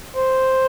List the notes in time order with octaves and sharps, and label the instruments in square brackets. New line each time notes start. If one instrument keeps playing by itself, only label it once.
[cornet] C5